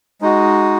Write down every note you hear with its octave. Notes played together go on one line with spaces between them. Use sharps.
G#3 D#4 F#4